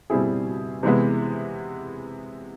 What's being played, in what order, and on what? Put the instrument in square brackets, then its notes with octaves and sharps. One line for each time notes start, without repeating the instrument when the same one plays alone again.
[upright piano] B2 G3 C4 E4 G#4
C3 E3 G#3 B3 E4